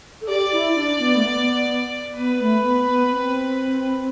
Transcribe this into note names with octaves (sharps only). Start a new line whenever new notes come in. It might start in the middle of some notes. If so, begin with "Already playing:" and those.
A4
G4 D5
E4
D4
B3
A3
B3
B3 B4
A3
B3
B3
C4